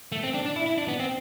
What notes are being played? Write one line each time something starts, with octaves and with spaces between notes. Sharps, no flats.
A3
C4
D4
D4
E4
E4
D4
B3
C4